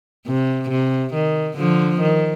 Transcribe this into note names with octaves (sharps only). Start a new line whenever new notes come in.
C3
C3
D#3
D3 F3
D#3